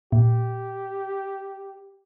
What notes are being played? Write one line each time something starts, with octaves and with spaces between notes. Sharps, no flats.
A#2 G4